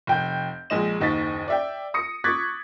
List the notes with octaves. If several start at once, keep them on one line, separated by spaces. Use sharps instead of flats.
F1 G5 G6
A#1 G#3 D#5 E7
F#1 D#2 D#5 C#6 A6 B6
D5 E5 G5
D#6 A#6 C#7
C#6 D6 F#6 G#6 A6 B6